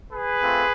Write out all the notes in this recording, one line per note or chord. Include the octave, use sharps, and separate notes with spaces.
G#4 B4
A3 C4 F4